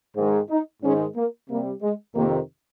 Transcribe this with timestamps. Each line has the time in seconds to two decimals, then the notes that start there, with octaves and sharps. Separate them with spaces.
0.16 G#2 D#3 G#3
0.50 D#4
0.83 G#2 D#3 G#3 C#4
1.16 A#3
1.49 C3 G3 A#3
1.82 G#3
2.16 F2 C3 D#3 A#3